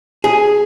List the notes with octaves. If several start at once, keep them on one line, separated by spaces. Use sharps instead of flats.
G#4